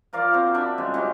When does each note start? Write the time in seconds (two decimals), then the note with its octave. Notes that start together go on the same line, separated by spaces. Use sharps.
0.13 F3 A#4 D5 F5
0.32 C4 F#4
0.55 D4 E5 B5
0.78 C#3 G3 G#3 C5
0.94 F#3 C#4 D#4 G4